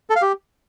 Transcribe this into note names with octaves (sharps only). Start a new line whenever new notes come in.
A4
F5
G4